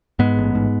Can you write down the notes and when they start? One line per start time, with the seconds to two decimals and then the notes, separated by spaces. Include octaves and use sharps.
0.19 G#2 G#3 B3
0.37 A1
0.55 G#2